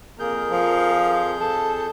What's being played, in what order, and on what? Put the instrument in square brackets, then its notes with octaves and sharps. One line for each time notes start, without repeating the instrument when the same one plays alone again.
[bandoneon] F2 G#4 G6 [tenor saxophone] A#3 [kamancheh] A#4
[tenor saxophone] F3
[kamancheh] A4